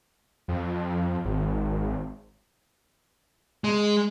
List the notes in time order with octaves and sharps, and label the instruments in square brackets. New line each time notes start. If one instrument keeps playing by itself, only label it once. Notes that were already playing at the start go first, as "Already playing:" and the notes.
[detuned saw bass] F2
G#1
[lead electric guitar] G#3